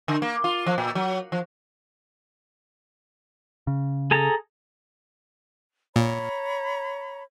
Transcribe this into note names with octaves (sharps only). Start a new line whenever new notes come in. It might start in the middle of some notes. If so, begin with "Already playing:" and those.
D3
A#3
F4
F3
A#2
F#3
F3
C#3
G#4 A4 A#5
A#2 C#5 A#5 B5